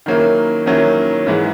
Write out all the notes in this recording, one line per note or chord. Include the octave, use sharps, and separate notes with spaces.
D#3 F#3 A#3 C#4 E4
D#3 F#3 A#3 C#4 E4
G#2 E3 G#3